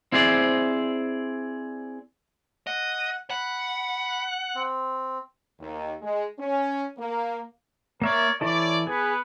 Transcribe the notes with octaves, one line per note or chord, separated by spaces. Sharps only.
C4 E4 G#4 C5 D5
D#5 F#5
F#5 B5
C4
D#2
G#3
C#4
A#3
A#3 A#4 C#5 D5 E5 C#6
E3 E4 A4 C#5 D5
B3 G#4 B4